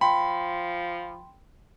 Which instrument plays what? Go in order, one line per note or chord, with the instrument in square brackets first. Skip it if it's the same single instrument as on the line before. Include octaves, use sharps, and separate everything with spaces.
[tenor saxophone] F3 [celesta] G5 C6 [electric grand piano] B5